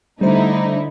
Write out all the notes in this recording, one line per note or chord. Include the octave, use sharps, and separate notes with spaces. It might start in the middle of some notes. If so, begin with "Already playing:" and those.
D3 G3 A3 D#4 E4 C5